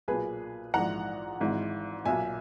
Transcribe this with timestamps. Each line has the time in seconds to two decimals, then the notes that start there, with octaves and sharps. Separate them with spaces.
0.08 B1 A#2 G#4 B4
0.74 A#1 G#2 E3 F#5 A#5
1.40 G#1 G#2 E3
2.05 B1 A#2 E5 G#5